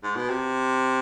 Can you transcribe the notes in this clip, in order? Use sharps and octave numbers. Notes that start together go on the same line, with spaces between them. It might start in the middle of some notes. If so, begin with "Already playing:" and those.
G#2
B2
C3